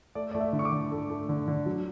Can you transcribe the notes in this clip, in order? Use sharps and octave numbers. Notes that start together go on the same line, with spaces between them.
A3 D5
A3 D5
E5
D3
C#6
D6
D3
A3
A3
D3
D3
F#3